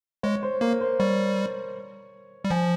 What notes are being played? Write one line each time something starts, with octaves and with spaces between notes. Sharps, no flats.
G#3 C#5
C5
A#3 A#4
C5
G3 C#5
G3
F3 G#5